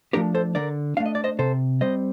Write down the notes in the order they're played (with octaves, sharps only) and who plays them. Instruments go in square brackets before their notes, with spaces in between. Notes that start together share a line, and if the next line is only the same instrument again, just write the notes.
[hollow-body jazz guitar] F3 A3 D4 G4 A#4
A4 C5
D3 A#4 D5
A3 D4 F5
D#5
D5
C5 D#5
C3 A4 C5
G3 C4 C5 D#5